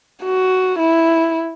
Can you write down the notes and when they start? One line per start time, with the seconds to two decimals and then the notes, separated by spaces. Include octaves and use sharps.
0.24 F#4
0.79 E4